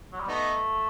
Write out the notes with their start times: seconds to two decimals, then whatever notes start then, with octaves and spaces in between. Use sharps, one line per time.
0.13 F#3
0.21 G3
0.28 A3 B3 D#4